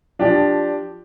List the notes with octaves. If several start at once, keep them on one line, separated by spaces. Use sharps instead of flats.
F3 D4 G4